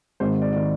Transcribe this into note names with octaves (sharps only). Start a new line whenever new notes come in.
G#1 G#2 D#3 C5
D5
D5
D#3